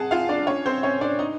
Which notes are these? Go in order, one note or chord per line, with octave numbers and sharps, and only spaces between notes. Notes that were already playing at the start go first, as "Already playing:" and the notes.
Already playing: G#4 F#5 G#5 A5
F4 F5
D4 D5
C#4 C#5
C4 C5
C#4 C#5
D4 D5
D#4 D#5